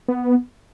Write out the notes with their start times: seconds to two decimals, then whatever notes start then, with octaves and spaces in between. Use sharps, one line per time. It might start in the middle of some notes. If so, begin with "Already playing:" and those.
0.08 B3